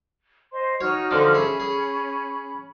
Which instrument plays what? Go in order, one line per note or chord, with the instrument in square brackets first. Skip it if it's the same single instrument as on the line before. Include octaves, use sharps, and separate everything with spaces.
[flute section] C5 D#5 C6
[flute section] D#4 F#4 F6 [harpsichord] C#5
[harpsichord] D3 F3 D4
[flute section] C#4 B5 [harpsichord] G#4 E5
[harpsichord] G#4